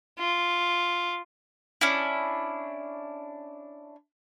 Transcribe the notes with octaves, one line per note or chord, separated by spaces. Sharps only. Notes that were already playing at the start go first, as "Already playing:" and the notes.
F4
C#4 D4 E4